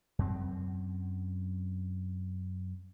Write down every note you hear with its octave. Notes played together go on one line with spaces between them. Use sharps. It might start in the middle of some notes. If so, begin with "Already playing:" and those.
F#2 C4